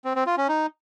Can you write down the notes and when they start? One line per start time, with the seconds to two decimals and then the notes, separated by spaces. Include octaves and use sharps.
0.05 C4
0.16 C4
0.27 F4
0.37 C#4
0.48 D#4